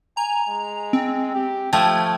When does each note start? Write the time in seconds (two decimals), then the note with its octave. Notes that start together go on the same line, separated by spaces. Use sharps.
0.17 G#5 A#5
0.48 G#3
0.93 C4
1.34 G4
1.73 F3 A3 G5 G#6